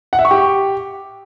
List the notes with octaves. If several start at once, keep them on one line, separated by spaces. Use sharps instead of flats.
F#5
E5
C#6
G4